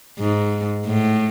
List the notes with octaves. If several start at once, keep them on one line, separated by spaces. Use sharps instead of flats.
G#2
A2